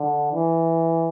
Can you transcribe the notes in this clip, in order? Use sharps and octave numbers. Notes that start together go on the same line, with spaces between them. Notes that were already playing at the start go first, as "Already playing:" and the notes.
Already playing: D3
E3